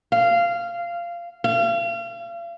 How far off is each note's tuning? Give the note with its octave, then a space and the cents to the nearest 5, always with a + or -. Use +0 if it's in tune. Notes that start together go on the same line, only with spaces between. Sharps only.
F5 -15
F5 -40